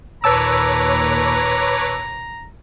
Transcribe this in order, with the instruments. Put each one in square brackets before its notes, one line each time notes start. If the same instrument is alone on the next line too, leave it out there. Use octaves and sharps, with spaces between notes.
[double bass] D#2 A#2 [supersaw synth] B4 C#5 D6 [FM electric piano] A5 E6 [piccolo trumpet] A#5